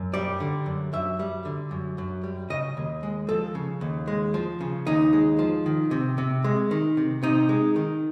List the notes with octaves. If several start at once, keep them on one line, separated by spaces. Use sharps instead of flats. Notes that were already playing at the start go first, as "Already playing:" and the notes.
Already playing: F#2
G3 D5
D3
F#2
F#2 E5
G3
D3
F#2
F#2
G3
C#3 D#5
D#2
G#3
F3 A4
C#3
D#2
G#3
F3
C#3
D#2 D#4
G#3
F3
D#3
C3
C3
G#3
D#3
C3
C3 D#4
G#3
D#3